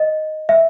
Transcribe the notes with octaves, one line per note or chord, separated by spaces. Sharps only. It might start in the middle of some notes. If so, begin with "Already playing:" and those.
Already playing: D#5
E5